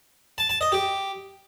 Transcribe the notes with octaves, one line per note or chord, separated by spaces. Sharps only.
A5
A5
D#5
G4